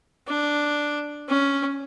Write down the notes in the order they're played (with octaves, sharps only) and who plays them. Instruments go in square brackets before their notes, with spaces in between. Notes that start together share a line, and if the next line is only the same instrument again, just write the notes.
[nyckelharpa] D4
C#4